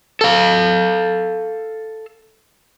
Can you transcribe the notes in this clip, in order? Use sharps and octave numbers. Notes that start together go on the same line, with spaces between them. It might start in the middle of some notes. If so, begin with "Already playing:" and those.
A4 F5